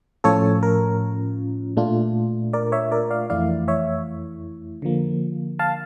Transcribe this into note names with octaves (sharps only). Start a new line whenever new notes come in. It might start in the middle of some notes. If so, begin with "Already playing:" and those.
A2 F3 C#4 F4 A4 C#5
A#4
A#2 A3 D4 F4
A#4 D5
C#5 E5
A#4 D5
D5 F5
F2 E3 A3 E4 D5 F5
C#5 E5
D3 F3 A#3
F5 A5